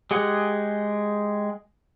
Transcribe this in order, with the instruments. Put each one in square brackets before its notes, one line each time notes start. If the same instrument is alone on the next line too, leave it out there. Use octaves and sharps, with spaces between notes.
[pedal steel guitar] G#3 G4 G#4 F#5